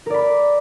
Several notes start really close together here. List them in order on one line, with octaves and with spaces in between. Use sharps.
A#4 D5 B5